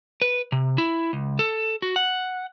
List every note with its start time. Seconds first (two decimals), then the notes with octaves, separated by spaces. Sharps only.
0.22 B4
0.52 C3
0.78 E4
1.13 C#2
1.39 A4
1.82 F#4
1.96 F#5